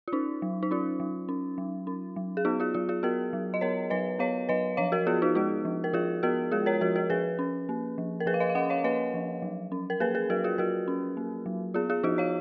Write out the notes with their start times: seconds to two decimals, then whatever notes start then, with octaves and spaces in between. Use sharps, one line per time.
0.08 F4
0.12 C#4 D#4
0.42 F#3
0.63 D#4
0.71 C#4 F4
1.00 F#3
1.29 C#4
1.58 F#3
1.87 C#4
2.16 F#3
2.37 G#4
2.45 B3 D#4 F#4
2.60 F4 G#4
2.74 F#3 F4
2.89 F4 G#4
3.03 B3 F#4 A#4
3.33 F#3
3.54 D#5
3.61 B3 A#4 C#5
3.90 F#3 B4 D#5
4.19 B3 C#5 F5
4.49 F#3 B4 D#5
4.77 F3 C#5 F5
4.92 F#4 A#4
5.07 B3 F4 G#4
5.22 D#4 F#4
5.35 G#3 D#4 F#4
5.65 F3
5.84 A#4
5.93 F3 F4 G#4
6.23 B3 F#4 A#4
6.52 G#3 F4 G#4
6.66 A#4 C#5
6.81 F3 F#4 A#4
6.96 F#4 A#4
7.10 F3 G#4 B4
7.39 C#4
7.69 A#3
7.98 F3
8.20 A#4
8.26 F3 G#4 B4
8.34 F5
8.40 B4 D#5
8.50 F5
8.55 C#4 D#5 F#5
8.70 C#5 F5
8.84 A#3 B4 D#5
9.14 F3
9.42 F#3
9.72 C#4
9.90 A#4
10.00 A#3 G#4 B4
10.15 G#4 B4
10.30 F#3 F#4 A#4
10.44 F4 G#4
10.58 F#3 F#4 A#4
10.88 C#4
11.17 A#3
11.46 F#3
11.74 B3 F4 G#4
11.90 F4 G#4
12.03 F3 D#4 F#4
12.18 C#5 F5